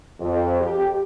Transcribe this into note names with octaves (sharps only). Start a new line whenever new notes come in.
F2
G4